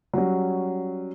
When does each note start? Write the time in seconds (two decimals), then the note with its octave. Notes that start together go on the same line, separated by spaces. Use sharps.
0.13 F#3 G3 C#4